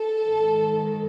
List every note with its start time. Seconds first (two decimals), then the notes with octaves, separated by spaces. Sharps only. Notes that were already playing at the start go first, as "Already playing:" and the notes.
Already playing: A4
0.25 G#2 D#3